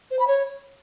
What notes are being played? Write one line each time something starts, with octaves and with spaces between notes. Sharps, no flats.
C5
B5
C#5